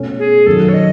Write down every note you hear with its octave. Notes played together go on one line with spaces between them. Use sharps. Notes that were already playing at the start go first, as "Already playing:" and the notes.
Already playing: B2 A3 C#4
G#4
F#2 D#3 F#3 A4
C#5
D#5